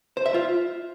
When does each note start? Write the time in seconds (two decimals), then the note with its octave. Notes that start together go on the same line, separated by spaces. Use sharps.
0.17 C5
0.26 E5
0.34 F4